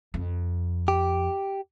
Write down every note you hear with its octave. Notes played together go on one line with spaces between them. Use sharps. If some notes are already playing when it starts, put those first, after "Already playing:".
F2
G4